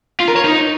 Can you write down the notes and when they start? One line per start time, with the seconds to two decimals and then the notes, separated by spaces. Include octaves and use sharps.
0.20 F4
0.28 A#4
0.36 C#5
0.44 D#4